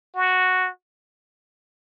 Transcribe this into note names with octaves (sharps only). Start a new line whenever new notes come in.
F#4